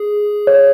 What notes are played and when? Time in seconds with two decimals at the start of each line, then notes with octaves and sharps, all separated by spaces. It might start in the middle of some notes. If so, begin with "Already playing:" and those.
Already playing: G#4
0.47 C#5